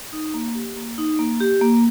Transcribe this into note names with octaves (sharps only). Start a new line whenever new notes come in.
D#4
A#3
G4
A#3
D#4
A#3
G4
A#3